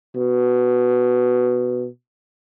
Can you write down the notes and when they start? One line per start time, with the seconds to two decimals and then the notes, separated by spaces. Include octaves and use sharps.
0.16 B2